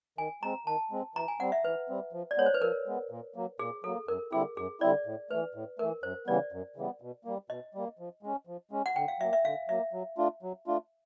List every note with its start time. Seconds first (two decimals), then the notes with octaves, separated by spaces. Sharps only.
0.18 D#3 G#5
0.43 G#3 C4 A#5
0.66 D#3 A5
0.91 G#3 C4
1.16 E3 A#5
1.28 G#5
1.40 G3 C4 F#5
1.52 E5
1.64 E3 B4
1.89 G3 C4
2.13 F3
2.31 D5
2.37 G#3 B3 C#5
2.46 C5
2.54 B4
2.61 F3 A#4
2.87 G#3 B3
3.10 A#2
3.36 F#3 A#3
3.59 A#2 G#4
3.84 F#3 A#3 A4
4.08 F#2 A#4
4.32 D3 G3 C4 E4 G#4
4.57 F#2 G#4
4.81 D3 G3 C4 E4 D5
5.06 A2
5.31 E3 A3 B4
5.54 A2
5.79 E3 A3 A#4
6.03 F#2 C5
6.27 C#3 E3 G3 B3 D5
6.52 F#2
6.76 C#3 E3 G3 B3
7.02 B2
7.25 G3 A#3
7.50 B2 D#5
7.75 G3 A#3
7.99 F3
8.23 G#3 C#4
8.47 F3
8.71 G#3 C#4
8.86 F#5
8.96 D3 G5
9.08 F5
9.20 F#3 A#3 E5
9.33 E5
9.45 D3 F5
9.69 F#3 A#3 E5
9.93 F#3
10.18 A3 D4 F4
10.43 F#3
10.67 A3 D4 F4